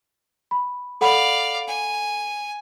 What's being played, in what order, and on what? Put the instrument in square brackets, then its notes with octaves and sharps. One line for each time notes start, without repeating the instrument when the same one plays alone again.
[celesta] B5
[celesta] A4 F#5 B5 [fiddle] D5 F5
[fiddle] G#5